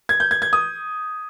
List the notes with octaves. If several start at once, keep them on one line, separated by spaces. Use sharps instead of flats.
G#6
G6
G#6
G#6
D#6